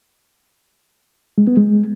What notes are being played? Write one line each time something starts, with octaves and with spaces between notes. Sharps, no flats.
G#3
B3
G#3